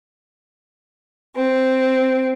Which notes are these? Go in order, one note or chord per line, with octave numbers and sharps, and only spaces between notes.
C4